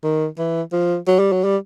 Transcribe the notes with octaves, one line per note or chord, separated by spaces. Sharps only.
D#3
E3
F3
F#3
G3
F#3
G3